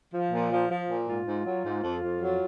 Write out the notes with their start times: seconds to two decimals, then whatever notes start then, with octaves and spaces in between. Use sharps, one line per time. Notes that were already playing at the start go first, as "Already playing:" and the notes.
0.13 F3
0.32 A#2
0.51 F3
0.70 F3
0.88 A#2
1.08 G#2 F4
1.26 G#2
1.46 F#3
1.65 G#2
1.84 F2
2.02 F2
2.21 F#3